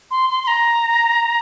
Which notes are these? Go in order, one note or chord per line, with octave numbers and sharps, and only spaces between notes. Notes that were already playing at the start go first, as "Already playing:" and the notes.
C6
C6
C6
A#5